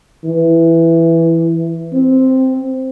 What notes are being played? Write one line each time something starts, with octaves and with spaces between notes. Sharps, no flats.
E3
C4